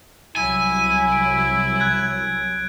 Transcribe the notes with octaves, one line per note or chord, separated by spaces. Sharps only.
C2 F#3 E4 G#5
D7
F#6 G#6